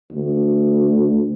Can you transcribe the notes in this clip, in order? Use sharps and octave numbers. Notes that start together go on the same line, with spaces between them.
D2